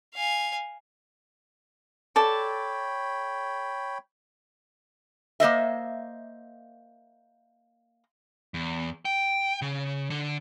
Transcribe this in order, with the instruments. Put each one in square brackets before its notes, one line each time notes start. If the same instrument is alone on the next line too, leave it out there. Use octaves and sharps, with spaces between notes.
[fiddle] F5 G#5
[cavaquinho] A4 D5 A5 [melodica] C#5 G5 B5
[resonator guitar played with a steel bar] A#3 C5 D#5 E5
[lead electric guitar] E2
G5
C#3
D3